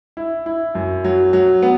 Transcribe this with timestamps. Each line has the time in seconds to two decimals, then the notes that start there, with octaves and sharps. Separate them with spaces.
0.17 E4
0.46 E4
0.75 F#2
1.04 F#3
1.33 F#3
1.62 B3